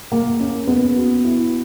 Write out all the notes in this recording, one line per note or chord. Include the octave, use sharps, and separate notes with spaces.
A#3
C#4
B3
F#4
E4